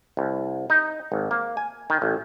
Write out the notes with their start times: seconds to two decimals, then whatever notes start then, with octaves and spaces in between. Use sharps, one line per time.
0.17 C2
0.70 D#4
1.12 G#1
1.31 A#3
1.57 G#5
1.90 D#3
2.02 A1